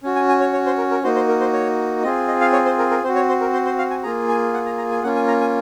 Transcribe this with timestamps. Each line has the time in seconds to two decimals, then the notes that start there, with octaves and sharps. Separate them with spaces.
0.03 C#4 F#4
0.16 G#5
0.28 G#5
0.40 C#5
0.53 C#5
0.66 C5
0.78 A#4
0.91 A#4
1.03 A#3 D#4 F#4 C5
1.16 C5
1.28 A#4
1.41 C5
1.53 C#5
2.03 C4 F4 G#4 D#5
2.28 D#5
2.41 F5
2.53 C#5
2.66 C5
2.78 A#4
2.90 A#4
3.03 C4 C5
3.08 F#4
3.16 C#5
3.28 C5
3.41 A#4
3.53 C5
3.65 C5
3.78 F5
3.90 G#5
4.03 A#3 F4 G#4 A#5
4.28 G#5
4.54 F#5
4.65 A#5
4.78 A#5
4.91 G#5
5.03 A#3 C#4 F4 F#5
5.16 G#5
5.28 A#5
5.41 G#5